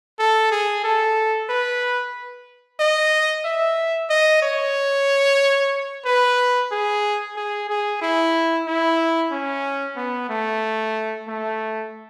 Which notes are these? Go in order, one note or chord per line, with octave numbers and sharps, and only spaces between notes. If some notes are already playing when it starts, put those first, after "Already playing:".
A4
G#4
A4
B4
D#5
E5
D#5
C#5
B4
G#4
G#4
G#4
E4
E4
C#4
B3
A3
A3